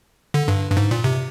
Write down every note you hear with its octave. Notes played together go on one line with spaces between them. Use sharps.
D3
G2
G2
G#2
A#2
C3